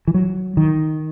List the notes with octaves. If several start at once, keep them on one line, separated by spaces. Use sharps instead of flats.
E3
F#3
D#3